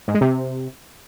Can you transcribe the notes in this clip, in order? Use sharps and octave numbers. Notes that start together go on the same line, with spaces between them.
G#2
G#3
C3